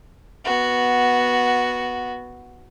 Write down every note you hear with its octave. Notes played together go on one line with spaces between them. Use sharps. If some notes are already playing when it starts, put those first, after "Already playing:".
B3 F#4